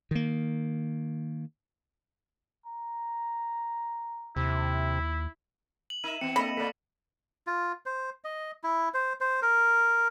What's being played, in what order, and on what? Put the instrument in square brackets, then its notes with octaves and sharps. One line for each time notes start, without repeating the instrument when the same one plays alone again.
[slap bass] D#3 A#3
[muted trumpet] A#5
[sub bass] D#2 [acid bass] C3 [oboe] E4
[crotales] F#7
[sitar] D#4 A#4 E5 [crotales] D#7 E7
[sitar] E3 B3 [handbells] C4 [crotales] C#7 E7
[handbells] A#3 A#6 [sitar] D4 A4 D#5 [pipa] B5
[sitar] B2 A#3 [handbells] A4 D5 [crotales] B6
[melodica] F4
C5
D#5
E4
C5
C5
A#4